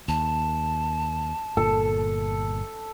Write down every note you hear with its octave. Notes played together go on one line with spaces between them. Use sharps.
D#2 A5
G1 A#2 A4